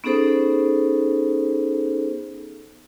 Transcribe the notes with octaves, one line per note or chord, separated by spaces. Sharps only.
B3 C#4 D#4 G#4 A4 C5